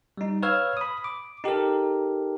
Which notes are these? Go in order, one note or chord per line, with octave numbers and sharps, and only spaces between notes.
G3 D#4
B4 C#5 F5 E6 F6 G#6
B5 D#6
D6
D#4 G4 A4 A#4